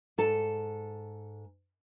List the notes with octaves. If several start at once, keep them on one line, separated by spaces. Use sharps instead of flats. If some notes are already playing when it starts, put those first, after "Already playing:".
G#2 A4 A5